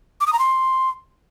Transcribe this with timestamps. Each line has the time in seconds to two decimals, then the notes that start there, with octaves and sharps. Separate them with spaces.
0.21 D6
0.27 D#6
0.33 A#5
0.39 C6